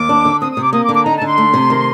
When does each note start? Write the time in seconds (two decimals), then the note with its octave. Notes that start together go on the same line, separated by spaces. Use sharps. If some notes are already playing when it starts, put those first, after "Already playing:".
Already playing: D#2 D6
0.09 D4
0.25 D3
0.41 C4 D#6
0.51 D#6
0.57 C3
0.63 D6
0.73 A#3 D#6
0.84 D6
0.89 D3
0.95 D6
1.05 D#4 A#5
1.17 A5
1.22 D3 C6
1.38 A3
1.54 C3
1.70 D#3